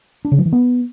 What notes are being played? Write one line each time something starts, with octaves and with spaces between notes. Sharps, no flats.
D4
C#3
F3
E3
B3